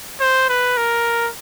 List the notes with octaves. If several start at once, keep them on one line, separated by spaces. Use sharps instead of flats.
C5
B4
A#4